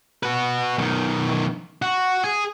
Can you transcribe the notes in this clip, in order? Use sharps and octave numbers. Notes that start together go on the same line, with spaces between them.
F#4 B4
B1 D#3
F#4
G#4